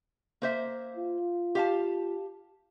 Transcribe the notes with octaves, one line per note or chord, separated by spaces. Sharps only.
A#3 C5 E5
F4
G4 F5 A5